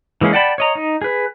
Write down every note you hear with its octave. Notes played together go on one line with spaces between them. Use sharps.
E3 G#3 A#3 C#4 G#4
D5 F#5 G5 A5 B5
C#5 D#5 A#5
D#4
G#4 B4